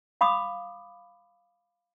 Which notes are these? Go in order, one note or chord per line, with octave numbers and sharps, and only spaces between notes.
F5 B5 D6 D#6